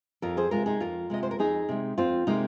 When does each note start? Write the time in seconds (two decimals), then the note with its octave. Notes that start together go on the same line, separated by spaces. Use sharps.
0.22 F2 F4 A#4
0.37 G#4 C5
0.51 C3 G#3 F4 A#4
0.66 D#4 G#4
0.80 F2 F4 A#4
1.10 C3 G#3 D#5
1.23 C5
1.31 A#4
1.39 F2 D#4 G#4
1.69 C3 G#3
1.98 F2 C4 F4
2.27 C3 G#3 A#3 D#4